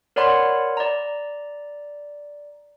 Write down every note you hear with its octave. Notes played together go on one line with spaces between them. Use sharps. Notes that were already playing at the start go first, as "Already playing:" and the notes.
A#4 C#5 D5 F#5 B5 C6
D5 A#5